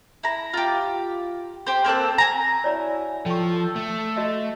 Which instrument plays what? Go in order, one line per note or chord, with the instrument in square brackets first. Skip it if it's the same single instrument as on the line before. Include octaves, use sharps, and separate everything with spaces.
[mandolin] E4 A#5
F4 G4
G4 C5
A#3 C4 A4 F#6
G#5 A#5
[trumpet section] E4 F#4 G#5 [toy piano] C#5 D5 A#5
[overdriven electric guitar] F3 [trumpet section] A4 [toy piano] G5 C#6
[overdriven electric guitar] A3
[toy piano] F#4 D#5 E5